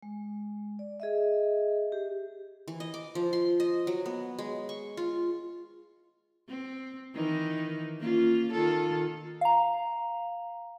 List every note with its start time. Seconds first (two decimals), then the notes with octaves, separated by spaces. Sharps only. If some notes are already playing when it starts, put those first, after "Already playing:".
0.02 G#3
0.79 D5
1.00 G#4 D#5 E5
1.92 G4
2.68 E3
2.80 D#5
2.94 D6
3.15 F3
3.33 C6
3.60 D#5
3.87 F#3
4.06 B3
4.39 G#3
4.69 C#6
4.97 F4
6.48 C4
7.15 D#3 E3 D#4
8.00 A#3 C#4 F4
8.52 D#3 F4 A4
9.41 F5 A#5